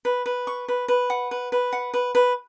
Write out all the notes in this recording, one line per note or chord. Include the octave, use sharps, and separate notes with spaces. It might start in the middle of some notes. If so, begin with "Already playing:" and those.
B4
B4
C#6
B4
B4
F#5
B4
B4
F#5
B4
B4